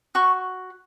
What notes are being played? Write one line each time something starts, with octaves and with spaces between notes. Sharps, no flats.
F#4 C#6